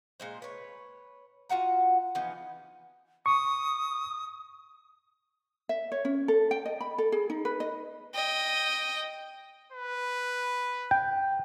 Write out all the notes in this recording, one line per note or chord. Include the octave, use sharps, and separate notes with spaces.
A#2 G#3 C5
B4 C#5
F4 F#4 F#5 A#5
E3 F3 B3 D#4
C#6 D#6
E5
C#5
C#4
A4
G5
D#5
B5
A4
G#4
D#4
B4
D#5
D#5 G5
B4
G5